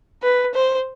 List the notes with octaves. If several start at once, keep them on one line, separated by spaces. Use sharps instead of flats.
B4
C5